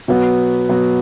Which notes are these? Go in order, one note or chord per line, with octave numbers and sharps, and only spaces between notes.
B2 F#3 B3 F#4
B2 F#3 B3 F#4